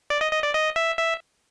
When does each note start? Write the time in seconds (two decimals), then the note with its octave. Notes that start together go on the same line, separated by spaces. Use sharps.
0.10 D5
0.21 D#5
0.32 D#5
0.43 D5
0.54 D#5
0.76 E5
0.98 E5